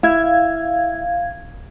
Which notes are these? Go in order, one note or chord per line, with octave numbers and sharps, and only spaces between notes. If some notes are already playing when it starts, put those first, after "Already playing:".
E4 F5 G#6